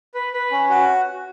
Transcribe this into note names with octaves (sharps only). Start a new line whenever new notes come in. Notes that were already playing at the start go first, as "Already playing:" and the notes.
B4
B4
C#4
F#4